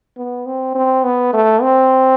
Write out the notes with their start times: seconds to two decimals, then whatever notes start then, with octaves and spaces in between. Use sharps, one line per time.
0.17 B3
0.46 C4
0.75 C4
1.04 B3
1.34 A3
1.62 C4